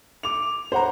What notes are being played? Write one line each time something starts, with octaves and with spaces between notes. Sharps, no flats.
D6 F7
C5 F#5 A#5